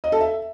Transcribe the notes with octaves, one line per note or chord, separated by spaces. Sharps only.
D#5
A4
E5